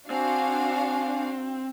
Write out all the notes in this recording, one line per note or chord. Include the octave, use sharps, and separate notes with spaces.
C4 D4 F#4 F5 G#5